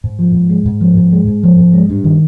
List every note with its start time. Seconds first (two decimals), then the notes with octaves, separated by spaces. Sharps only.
0.04 G#2
0.19 F3
0.35 G#2
0.50 G#3
0.66 G#2
0.81 F3
0.97 G#2
1.12 G#3
1.27 G#2
1.43 F3
1.59 G#2
1.73 G#3
1.90 G2
2.04 D#3